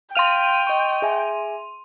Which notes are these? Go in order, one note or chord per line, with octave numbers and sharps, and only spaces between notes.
F5 G5 C6 F6 D#7 F7
D#5 C#6
G#4 E5 G#5